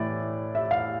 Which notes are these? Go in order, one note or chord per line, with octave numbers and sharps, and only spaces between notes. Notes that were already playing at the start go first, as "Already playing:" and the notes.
Already playing: A2 E3 D5
E5
F5